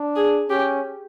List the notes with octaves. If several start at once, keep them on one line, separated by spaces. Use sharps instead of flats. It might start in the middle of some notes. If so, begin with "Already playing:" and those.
Already playing: D4
G#4
C#4 G4